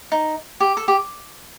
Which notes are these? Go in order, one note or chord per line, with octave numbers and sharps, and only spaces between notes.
D#4
G4
A4
G4